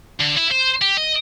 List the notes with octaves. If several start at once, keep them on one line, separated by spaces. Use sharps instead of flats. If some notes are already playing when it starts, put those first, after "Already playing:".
D3
E4
C5
G4
D#5